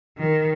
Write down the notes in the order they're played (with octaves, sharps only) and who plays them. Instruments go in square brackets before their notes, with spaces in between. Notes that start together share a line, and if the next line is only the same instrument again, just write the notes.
[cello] D#3